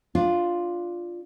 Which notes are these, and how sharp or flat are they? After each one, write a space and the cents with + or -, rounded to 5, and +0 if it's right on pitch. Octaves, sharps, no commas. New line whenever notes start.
D4 +0 F4 +0